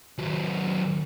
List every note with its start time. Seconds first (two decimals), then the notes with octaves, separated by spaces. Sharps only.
0.18 D#2 F#3